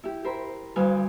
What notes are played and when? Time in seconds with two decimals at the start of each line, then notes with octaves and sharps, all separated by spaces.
0.04 E4 G4
0.24 G4 A#4 C5 B5
0.76 D2 G2 G3 F5 G#5